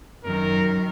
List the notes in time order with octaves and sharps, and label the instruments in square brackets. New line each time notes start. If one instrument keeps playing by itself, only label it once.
[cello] F#2 D#3 [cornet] A#4